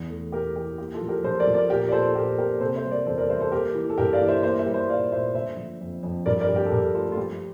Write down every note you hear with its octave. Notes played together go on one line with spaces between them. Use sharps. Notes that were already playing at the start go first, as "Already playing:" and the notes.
Already playing: E2
A3
A3 G4 A#4
E3 G4
A#3 G4
F4 A4
F3
G4 A#4
F3 A4 C5
A#4 D5
F3
A#4 D5
A#2 G4 A#4
D5
A#2 A4 C5
A#2 G4 A#4
A#3 G4 A#4
C3 A4 C5
C5 E5
G3
A#4 D5
E2 A4 C5
A#4 D5
G3 C5 E5
A4 C5
A#3 G4 A#4
E3
A4
G2 G4 A#4
D5 F5
E3
C5 E5
A#3 C5 E5
C5 E5
G3
C5 E5
A#2 D5 F5
A#2 C5 E5
D3 C5 E5
F3
F2
F2
G2 A#4 D5
A#4 D5
G2
G4
A4
G2 G4 A#4
A3 F4 A4
F4
F3 G4